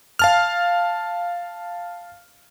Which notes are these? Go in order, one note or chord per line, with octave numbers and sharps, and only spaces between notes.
F5 A5 F6